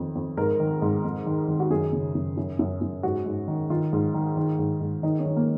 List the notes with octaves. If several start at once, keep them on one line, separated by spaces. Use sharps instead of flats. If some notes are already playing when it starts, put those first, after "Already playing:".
Already playing: F2 D#3
F2
G#2 A#4
D#3
G#2
F2
D#3
D#3
F#4
F#2 G#4
C#3
F#2
F#2
F#2
F#2
G#2 F#4
G#2
D#3
D#3 F4
G#2
D#3
D#3
G#2
G#2
D#3 D#4
C#4
D#3
A#3